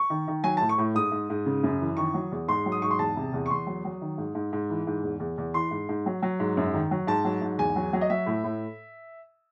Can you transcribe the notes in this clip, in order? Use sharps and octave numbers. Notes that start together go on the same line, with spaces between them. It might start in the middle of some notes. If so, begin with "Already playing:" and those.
Already playing: C#6
D#3
D#3
F#3 G#5
A2 A5
C#6
A2
G#2 D#6
G#2
G#2
C#3
F#2
E3
D#3 C#6
F#3
E2
G#2 C6
F#3
D#6
G#2 C#6
C6
E2 A5
C3
E2
C#6
E2 C6
F#3
F#3
D#3
G#2
G#2
G#2
E3
G#2
E2
E2
E2
E3 C6
G#2
G#2
F#3
F#3
G#2
F#2
D#3
F#3
G#2 A5
F#3
G#2
E2 G#5
F#3
F#3
D#5
F#3 E5
A2
A2